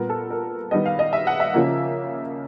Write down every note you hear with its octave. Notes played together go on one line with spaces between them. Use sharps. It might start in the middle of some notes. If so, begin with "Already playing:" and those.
Already playing: A#2 G3 B3 A#4
A4
A#4
D#3 G3 B3 D#5
F5
D#5
E5
F#5
E5
C#3 F3 A#3